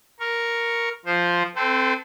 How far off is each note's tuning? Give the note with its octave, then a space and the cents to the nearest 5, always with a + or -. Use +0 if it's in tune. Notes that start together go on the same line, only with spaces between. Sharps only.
A#4 +0 C#6 +0
F3 +0 C5 +0
C4 +0 A4 +0 C5 -40